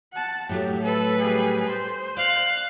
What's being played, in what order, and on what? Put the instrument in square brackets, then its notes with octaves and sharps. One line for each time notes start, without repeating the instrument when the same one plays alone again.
[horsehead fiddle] F#5 A5
[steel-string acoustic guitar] A2 F#3 A3 [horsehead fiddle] G4
[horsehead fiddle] A4 [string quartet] B4
[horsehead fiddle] G3 G#4
C5
[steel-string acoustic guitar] D5 [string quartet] F5 F#6